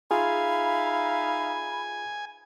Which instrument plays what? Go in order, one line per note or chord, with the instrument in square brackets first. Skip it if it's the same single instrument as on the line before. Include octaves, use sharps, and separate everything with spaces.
[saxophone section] D#4 E5 F5 [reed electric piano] F4 G#4 [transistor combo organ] G#5 [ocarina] B5